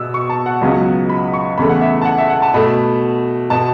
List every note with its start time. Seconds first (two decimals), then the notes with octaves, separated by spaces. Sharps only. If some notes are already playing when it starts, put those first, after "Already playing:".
Already playing: B2 B3 E6
0.14 C#6
0.30 A5
0.46 F#5
0.61 C#2 C#3 F#3 B3
1.09 B5
1.33 C#6
1.58 E2 C#3 E3 A3 B5
1.69 F#5
1.81 E5
2.02 A5
2.05 F#5
2.18 E5
2.30 F#5
2.42 A5
2.54 B2 A3 B5
3.50 B2 B3 A5